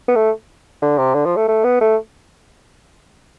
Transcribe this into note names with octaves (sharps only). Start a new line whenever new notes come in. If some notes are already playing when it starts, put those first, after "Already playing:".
B3
A3
D3
C3
D3
F3
A3
A3
B3
A3